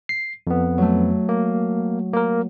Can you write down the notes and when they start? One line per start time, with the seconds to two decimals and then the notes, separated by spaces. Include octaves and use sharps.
0.09 C7
0.47 F2 B3
0.78 F#3 A3
1.29 A#3
2.13 A#3 A#4